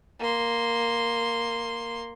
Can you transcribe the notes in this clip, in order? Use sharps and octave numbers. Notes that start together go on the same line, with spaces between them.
A#3 C6